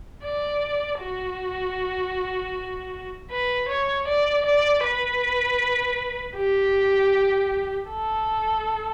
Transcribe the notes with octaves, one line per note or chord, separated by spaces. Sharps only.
D5
F#4
B4
C#5
D5
D5
B4
G4
A4